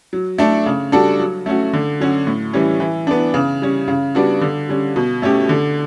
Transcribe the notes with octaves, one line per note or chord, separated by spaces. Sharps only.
F#3
A3 D4 A4
C#3
G3 D4 F#4 A4
F#3
A3 C#4 F#4
D3
F#3 C#4 F#4
A2
E3 G3 C#4
E3
B3 D4
C#3
G3 C#4
C#3
G3 B3 D4 F#4
D3
G3 C#4
B2
A3 C#4 G4
D3